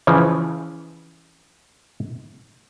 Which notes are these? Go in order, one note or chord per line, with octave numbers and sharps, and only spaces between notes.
C#3 E3 F3